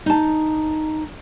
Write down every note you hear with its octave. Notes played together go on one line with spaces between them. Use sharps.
D#4 A5